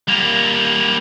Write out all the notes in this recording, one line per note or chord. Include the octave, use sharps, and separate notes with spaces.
G3 A#3